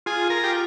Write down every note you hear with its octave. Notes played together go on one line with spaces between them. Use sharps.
F4 G#4
A#4
G4